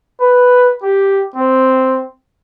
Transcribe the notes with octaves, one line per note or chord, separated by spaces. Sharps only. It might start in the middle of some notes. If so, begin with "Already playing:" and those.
B4
G4
C4